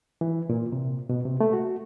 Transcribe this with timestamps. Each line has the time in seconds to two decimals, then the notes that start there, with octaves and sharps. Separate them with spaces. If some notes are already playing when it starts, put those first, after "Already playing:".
0.21 E3
0.50 A#2
0.72 C3
1.09 B2
1.25 C3
1.41 A3
1.53 F#4